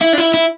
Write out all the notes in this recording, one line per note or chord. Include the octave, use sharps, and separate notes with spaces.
E4
D4
E4
E4